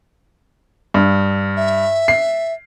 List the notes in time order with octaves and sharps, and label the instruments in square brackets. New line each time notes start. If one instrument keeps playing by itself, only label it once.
[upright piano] G2
[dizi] E5
[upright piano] C7